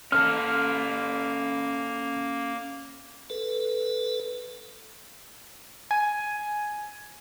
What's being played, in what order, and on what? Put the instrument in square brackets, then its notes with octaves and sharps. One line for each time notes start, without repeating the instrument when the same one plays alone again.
[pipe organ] A#3 [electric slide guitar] C#4 A4 [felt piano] F6
[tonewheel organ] A4 B4
[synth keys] G#5